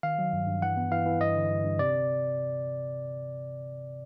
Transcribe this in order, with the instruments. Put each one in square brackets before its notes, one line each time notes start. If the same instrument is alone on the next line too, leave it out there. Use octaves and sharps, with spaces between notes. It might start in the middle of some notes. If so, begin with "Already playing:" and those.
[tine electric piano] D#3 F5
F#3
G2
G2
E3 F#5
B3
E3 F5
E3
G2 D#5
D3
G2
G2
C3 D5